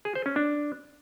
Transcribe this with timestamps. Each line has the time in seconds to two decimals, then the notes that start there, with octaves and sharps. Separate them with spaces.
0.05 G#4
0.15 C5
0.26 C#4
0.36 D4